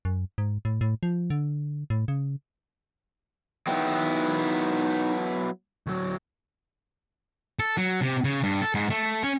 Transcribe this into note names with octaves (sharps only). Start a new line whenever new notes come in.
F#2
G#2
A2
A2
F3
D3
A2
C#3
F#3 B3 D#4 E4 G5
D2 F#3
A4
F#3
C3
C#3
G2
A4
G#2
A3
C#4